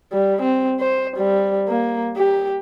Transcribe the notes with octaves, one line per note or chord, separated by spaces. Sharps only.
G3
C4
C5
G3
A#3
G4